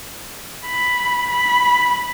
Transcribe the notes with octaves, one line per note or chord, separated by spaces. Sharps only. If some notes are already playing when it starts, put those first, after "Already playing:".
B5
B5